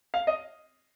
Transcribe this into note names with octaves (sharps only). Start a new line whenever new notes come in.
F5
D#5